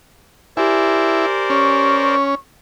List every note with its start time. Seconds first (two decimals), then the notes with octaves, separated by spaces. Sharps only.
0.57 E4 G4 A#4 C5 D5 G#5
1.50 C#4 C#6